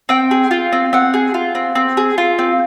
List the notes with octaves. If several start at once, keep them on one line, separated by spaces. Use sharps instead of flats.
C4 G5
G#4
F4
C4
C4 F#5
G#4
F4
C4
C4
G#4
F4
C4